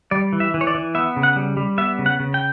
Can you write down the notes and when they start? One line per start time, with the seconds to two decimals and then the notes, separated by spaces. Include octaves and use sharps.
0.11 G3 D5
0.33 E3
0.40 E5
0.54 E3
0.61 C#5
0.67 D5
0.75 E3
0.95 B3 E5
1.16 C#3
1.23 F#5
1.36 G3
1.57 G3
1.78 B3 E5
1.99 C#3
2.06 F#5
2.20 C#3
2.34 G5